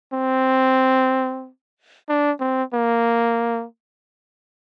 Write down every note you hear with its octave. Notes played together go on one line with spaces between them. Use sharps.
C4
D4
C4
A#3